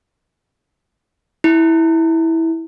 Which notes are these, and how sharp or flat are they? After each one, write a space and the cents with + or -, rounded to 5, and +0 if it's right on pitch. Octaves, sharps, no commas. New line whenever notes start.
E4 -15